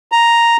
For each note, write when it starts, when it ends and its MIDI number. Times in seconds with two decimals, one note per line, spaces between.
0.12 0.57 82